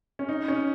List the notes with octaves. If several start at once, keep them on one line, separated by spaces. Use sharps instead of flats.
C#4
D#4
C#4